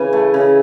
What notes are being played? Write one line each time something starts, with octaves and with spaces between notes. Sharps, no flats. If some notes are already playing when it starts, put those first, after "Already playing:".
Already playing: C#3 E3 G#5
A3
C#3